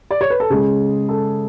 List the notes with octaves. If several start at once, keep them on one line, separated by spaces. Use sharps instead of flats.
D5
C#5
B4
A4
C#3 G#3 G#4
A4